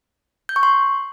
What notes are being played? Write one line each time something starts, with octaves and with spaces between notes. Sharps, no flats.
G6
C#6
C6